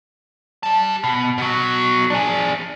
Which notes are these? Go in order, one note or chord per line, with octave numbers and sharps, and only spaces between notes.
G4 A5
B2
B2 F#3
D4 G#4